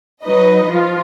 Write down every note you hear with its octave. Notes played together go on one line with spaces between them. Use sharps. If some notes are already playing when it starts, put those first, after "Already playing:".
F#3 D#4 B4 D#5
F3 F4